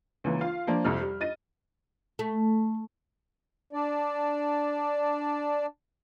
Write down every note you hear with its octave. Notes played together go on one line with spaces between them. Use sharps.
C#2 E3 A#3
F4 F5
F3 A#3 D4
C2 F2 F6
G3
D#5 A6 D#7
A3
D4 D5